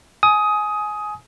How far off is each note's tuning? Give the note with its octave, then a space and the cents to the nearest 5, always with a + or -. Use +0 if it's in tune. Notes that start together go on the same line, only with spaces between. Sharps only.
G#5 +20 D#6 +15